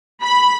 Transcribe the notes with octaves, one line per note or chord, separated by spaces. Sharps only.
B5